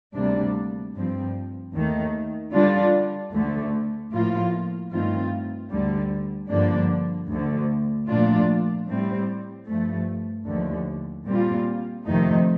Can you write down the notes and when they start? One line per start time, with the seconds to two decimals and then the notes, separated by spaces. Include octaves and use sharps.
0.15 D2 C3 G3 A#3 D4
0.95 G2 F3 C4
1.73 D#2 D#3 A3
2.52 D3 G3 D4 F4
3.33 D2 D3 A3
4.11 A2 F3 A#3 F4
4.91 G2 D#3 A3 C4 F4
5.70 D2 D3 G3
6.49 G2 D3 F3 A#3 D4
7.29 D2 D3 A3
8.08 A#2 F3 A3 D4 F4
8.88 A2 G3 C4
9.67 G2 F3 A3
10.46 D#2 D3 F3 A3
11.26 A#2 G3 C4 F4
12.05 F2 C3 D#3 A3 D#4